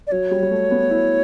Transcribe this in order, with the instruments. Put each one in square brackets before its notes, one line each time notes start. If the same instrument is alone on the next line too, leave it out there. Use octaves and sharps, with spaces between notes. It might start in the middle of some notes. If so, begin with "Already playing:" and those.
[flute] D5
[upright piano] F#3 [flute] C#5
[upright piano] G3
G3
A3
B3
E4